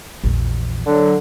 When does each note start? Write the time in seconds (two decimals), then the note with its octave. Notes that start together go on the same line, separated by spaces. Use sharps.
0.24 A#1 E2
0.86 D3 F#3